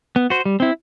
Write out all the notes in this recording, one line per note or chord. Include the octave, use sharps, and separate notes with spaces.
B3
F#4 C5
G3
C4 E4